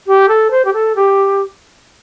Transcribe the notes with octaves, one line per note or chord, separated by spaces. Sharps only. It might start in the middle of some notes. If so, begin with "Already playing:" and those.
G4
A4
C5
G4
A4
G4